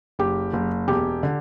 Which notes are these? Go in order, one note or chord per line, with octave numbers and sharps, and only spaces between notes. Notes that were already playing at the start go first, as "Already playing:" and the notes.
F#1 G4
F#1
E1 G4
D3